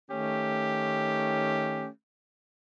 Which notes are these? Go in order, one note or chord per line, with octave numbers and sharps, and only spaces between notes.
D#3 A3 C#4 G4